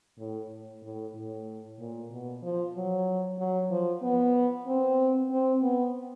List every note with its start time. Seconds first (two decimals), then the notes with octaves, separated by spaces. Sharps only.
0.18 A2
0.83 A2
1.14 A2
1.79 A#2
2.11 B2
2.42 F3
2.75 F#3
3.39 F#3
3.70 F3
4.02 B3
4.67 C4
5.30 C4
5.62 B3